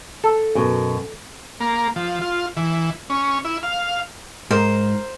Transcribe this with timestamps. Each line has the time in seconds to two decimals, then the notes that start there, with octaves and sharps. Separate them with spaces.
0.24 A4
0.55 F#2 B2
1.60 A#3
1.96 F3
2.21 F4
2.57 E3
3.10 C#4
3.45 E4
3.63 F5
4.51 G#2 A#4 C5